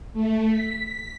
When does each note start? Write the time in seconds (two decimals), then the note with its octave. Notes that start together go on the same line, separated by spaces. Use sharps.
0.13 A3
0.48 B6